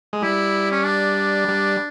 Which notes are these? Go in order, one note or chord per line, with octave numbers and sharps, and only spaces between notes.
G#3
G3 E4
C#4
D4
G3